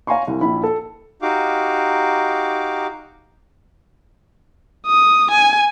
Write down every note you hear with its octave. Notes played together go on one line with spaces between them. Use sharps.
C#5 F5 G#5 A#5 C6 C#6
C2
A#1 E4 B5
A4
D#4 F#4 G4 F5 D6
D#6
G#5